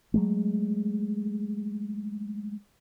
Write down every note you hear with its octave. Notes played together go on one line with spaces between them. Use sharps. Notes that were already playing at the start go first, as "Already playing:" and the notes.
F#3 G#3 A3